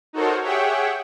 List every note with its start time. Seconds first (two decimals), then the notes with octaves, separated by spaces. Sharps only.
0.13 D#4 F#4 A4 A#4 C5 C#5
0.42 G4 G#4 C#5 E5 F#5 G5